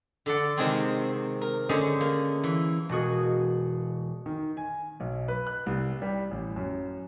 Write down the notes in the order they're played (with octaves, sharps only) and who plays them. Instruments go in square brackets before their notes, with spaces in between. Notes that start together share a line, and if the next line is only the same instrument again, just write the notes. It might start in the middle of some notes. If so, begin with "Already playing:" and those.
[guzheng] D3 A4 D5 F#5
C3 D#3 G#3 C4 G#4
A#4
D3 C#4 G#4 C5 D#5
A#3
E3
[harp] E1 A#3 F#4 G#4
[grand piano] D#3
G#5
B1
B4
F#6
C2
G3
A1
F#2